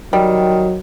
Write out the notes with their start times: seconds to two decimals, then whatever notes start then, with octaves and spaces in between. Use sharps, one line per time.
0.13 D#3 F#3 G3